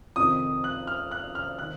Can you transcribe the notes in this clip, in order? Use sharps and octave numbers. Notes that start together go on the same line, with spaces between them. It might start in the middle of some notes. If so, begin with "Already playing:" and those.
F2 C3 D#3 D#6
F#6
F6
F#6
F6
D#3 F#6